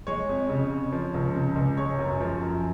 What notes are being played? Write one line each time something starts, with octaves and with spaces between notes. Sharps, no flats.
G#3 C#5
F2
C#3
F2
F3
C#2
C#3
C#2
G#3 C#5
F#2
F3
F#2